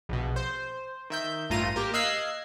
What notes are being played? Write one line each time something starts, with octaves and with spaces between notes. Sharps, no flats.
A#1 B2
C5
D#3 E5 G6
A1 G2 A3 F4 A#5 D#7
A#3 G4 A#4
D#5 F5 E6 F#6 G#6 C7